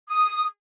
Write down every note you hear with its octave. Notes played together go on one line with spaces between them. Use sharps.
D#6